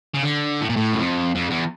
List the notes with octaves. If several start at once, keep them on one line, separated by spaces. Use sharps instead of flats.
C#3
D3
A2
A#2
A2
F#2
F2
F2
E2